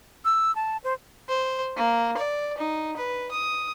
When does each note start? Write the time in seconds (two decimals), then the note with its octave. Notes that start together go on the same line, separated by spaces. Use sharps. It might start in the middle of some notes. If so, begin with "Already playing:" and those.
0.25 E6
0.56 A5
0.84 C5
1.28 C5
1.77 A#3
2.17 D5
2.58 D#4
2.97 B4
3.31 D#6